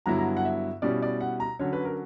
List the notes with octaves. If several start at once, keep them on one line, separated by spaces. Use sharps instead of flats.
G2 D3 F#3 B3 E4 A#5
A#5
F#5
E5
B2 G3 C#4 E4 D5
D5
F#5
A#5
D3 F#3 C#4 C#5
B4
A#4